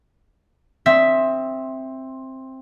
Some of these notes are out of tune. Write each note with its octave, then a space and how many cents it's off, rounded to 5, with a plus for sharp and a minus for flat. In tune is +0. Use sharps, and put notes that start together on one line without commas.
C4 +10 E5 +0 D#6 +20